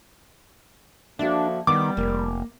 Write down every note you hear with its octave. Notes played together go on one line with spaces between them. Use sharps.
D3 F3 A#3 D4 F#4 A4 E5
D#3 G3 B3 D6
F1 A#3